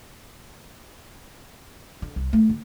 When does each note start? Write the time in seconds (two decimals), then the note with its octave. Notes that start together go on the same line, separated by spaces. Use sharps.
2.02 D3
2.16 C2
2.33 A3
2.49 D3